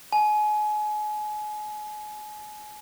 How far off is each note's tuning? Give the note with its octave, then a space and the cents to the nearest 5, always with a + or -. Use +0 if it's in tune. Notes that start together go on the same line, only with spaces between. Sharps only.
G#5 +30